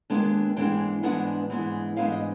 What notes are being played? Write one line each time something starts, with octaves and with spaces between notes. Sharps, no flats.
D#2 D#3 G#3 B3 D4
G#2 E3 G#3 B3 D4 G5
G#2 E3 G#3 B3 D4 F#5
G#2 E3 G#3 B3 D4
G#2 E3 G#3 B3 D4 F5
D#5